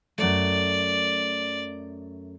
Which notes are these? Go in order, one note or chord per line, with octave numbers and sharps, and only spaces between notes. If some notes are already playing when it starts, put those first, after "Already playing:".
F#2 A3 D5